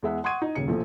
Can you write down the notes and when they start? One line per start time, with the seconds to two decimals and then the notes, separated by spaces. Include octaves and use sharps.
0.03 E2 G#3 E5 F#5
0.24 F#5 C6 C#6 D#6 G#6 D#7
0.42 D#4
0.55 D#1 C#3 C#7
0.67 A#1 B2 F3 A3